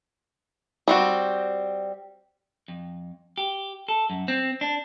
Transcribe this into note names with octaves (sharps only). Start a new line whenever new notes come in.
G3 C4 F#4
F2
G4
A4
F#2
C4
D4